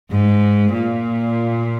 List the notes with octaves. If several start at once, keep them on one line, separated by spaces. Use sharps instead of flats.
G#2
A#2